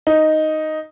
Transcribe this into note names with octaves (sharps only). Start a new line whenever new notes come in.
D#4